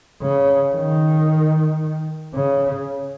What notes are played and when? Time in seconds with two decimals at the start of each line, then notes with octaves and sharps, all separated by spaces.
0.22 C#3
0.76 D#3
2.34 C#3